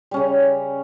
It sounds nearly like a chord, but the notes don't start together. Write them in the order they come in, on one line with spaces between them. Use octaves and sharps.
G3 C#4 C#3